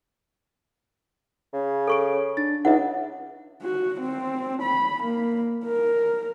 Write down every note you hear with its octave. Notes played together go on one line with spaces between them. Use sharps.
C#3
A4 C#6 D7
D4 A6
C#2 D#4 E5 F#5
F#4
C4
B5
A#3
A#4